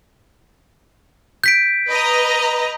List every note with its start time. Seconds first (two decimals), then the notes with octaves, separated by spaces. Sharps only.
1.44 G6 B6 D7
1.88 B4 D#5 A#5